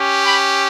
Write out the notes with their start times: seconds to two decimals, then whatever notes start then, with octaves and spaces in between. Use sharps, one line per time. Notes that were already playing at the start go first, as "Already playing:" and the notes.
Already playing: C#4 G4
0.24 G5 B5